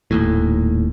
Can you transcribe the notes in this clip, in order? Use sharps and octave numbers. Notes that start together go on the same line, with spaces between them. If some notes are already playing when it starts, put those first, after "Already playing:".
D#1 D#2 A2